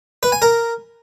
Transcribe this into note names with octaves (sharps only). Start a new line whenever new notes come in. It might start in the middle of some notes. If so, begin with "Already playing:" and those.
B4
G#5
A#4